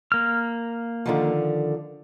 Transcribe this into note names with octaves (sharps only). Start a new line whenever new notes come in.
A#3 F6
D3 D#3 F3